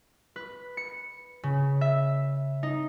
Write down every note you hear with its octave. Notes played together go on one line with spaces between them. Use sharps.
B4
C#7
C#3
E5
D#4